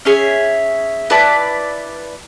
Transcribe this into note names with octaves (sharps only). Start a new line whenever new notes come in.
C#4 G#4 C#5 E5
E4 B4 D5 A5